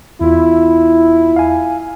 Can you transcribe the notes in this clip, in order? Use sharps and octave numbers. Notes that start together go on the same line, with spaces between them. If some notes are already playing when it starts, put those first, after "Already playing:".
E2 E4 F4
F5 G#5